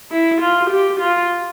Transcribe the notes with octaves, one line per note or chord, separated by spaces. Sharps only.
E4
F4
G4
F4